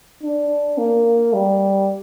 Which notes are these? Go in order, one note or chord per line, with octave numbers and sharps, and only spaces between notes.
D4
A#3
G3